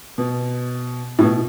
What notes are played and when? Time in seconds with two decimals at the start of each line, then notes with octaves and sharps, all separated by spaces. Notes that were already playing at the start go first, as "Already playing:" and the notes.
0.18 B2
1.19 A2
1.23 B2